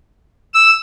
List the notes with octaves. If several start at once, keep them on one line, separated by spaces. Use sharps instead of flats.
E6